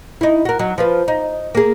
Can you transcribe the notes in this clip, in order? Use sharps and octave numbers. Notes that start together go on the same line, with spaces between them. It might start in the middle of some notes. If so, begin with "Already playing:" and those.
D#4 E4
F#4 A#4
F#3 D#4
F3 F4 B4
D#4
A#3 G#4